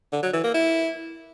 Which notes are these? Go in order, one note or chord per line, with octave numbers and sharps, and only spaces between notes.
D3
F#3
E3
A#3
E4